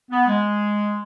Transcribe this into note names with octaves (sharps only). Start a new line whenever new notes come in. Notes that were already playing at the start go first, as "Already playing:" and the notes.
B3
G#3